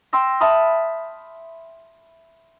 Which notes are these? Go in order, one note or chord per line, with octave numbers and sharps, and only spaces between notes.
G5 C6 E6 A#6
E5 A5 B5 D#6 F6